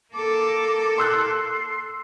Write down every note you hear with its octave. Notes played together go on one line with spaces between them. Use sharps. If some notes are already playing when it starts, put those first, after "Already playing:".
A#3 A4 D6
C6 E6 F#6 C7